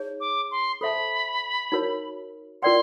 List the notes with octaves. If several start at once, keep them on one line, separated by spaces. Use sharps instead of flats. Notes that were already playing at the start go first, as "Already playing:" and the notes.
Already playing: D#4 G#4 C#5
D6
C6
A4 C5 E5 A5 B5
D#4 F#4 A#4 C#5
F4 A#4 D5 G5 C6